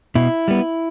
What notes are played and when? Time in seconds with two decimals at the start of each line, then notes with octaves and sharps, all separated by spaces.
0.15 B2 E4
0.48 G3 B3